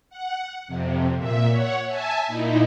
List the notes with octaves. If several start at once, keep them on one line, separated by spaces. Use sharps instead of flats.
F#5
F2 C3
A#2 E5
C#5 F#5
E5 G#5 A5
A#2 D#4 E4